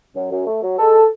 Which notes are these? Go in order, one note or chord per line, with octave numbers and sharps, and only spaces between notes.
F#2
F#2
A3
F#3
G#3 A4